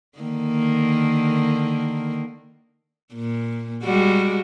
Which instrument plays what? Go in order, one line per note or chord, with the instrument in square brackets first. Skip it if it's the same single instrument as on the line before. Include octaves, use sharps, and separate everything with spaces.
[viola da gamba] D3 D#3 A#3
A#2
G3 G#3 F#4